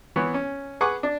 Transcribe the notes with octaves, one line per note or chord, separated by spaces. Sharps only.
E3 B3 C#5
C#4
G#4 B4 F#5 G#5 C#6 D6
D4